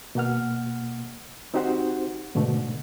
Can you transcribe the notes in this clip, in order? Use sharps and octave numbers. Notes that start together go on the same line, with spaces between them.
B2 A#3 F#5 F6
C4 D#4 F#4 G4 C5 F#5
G#2 B2 D3 A3